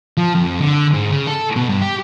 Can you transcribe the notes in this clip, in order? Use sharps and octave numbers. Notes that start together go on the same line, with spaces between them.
F3
F2
D3
G#2
C#3
A4
B2
G2
G4